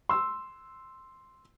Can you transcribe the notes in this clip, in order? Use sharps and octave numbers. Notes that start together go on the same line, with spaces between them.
C6 E6